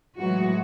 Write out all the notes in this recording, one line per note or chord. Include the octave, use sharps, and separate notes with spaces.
A2 E3 F#3 G#3 F#4